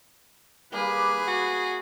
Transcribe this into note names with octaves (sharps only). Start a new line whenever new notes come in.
G3 A#3 G#4 B4
F#4